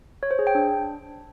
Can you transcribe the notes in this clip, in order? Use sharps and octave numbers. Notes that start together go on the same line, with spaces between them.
C#5
C5
G#4
G5
D4